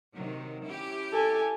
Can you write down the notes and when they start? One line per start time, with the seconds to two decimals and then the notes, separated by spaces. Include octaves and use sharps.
0.16 C3 D#3 F#3
0.63 C#4 E4 G4
1.13 A4 G#5